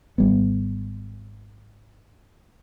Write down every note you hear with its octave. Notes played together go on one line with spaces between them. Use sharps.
G#1 G3 B3